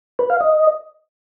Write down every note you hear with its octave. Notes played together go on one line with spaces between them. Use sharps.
B4
F5
D#5